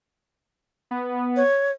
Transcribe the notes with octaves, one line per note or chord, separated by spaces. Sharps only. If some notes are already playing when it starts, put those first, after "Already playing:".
B3
C#5